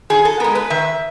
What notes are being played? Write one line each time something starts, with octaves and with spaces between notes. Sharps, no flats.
D#3 G#4
A4
G#3 B3 A#4
B4
D#3 E5